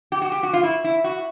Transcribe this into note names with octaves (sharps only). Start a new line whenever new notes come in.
G4
F#4
G4
F#4
F4
E4
E4
F#4